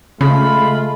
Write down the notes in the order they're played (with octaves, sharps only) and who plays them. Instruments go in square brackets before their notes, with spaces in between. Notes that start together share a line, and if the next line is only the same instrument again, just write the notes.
[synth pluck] C#3 [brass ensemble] G#3 A3 F4 [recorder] B5